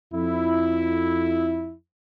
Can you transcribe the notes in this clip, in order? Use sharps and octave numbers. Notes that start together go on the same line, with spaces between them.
F2 E4